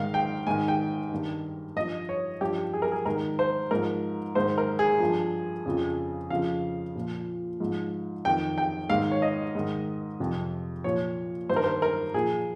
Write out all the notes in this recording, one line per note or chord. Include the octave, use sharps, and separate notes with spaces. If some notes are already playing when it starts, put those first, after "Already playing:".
Already playing: G#2 D#3 F5
G5
G#2 D#3 G#5
G5
G2 D#3
G2 F3 D#5
C#5
G2 F3 G4
G#4
A#4
G#4
G#2 D#3 A#4
C5
G#2 F3 A#4
G#2 D#3 C5
A#4
G#4
G2 F3
F2 C#3 F3
F2 C#3 F3 F5
A#2 F3
G#2 F3
F2 D#3 G5
G5
G#2 D#3 F5
C#5
D#5
G#2 D#3
F2 C3 F3
A#2 F3 C#5
G2 D#3 C5
A#4
C5
A#4
A#2 F3 G#4